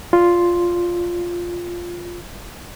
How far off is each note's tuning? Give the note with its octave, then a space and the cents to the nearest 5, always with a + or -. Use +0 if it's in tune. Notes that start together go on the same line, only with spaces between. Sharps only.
F4 +0 D5 +0 C6 +0